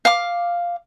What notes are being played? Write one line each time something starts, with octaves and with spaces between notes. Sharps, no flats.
F5 D6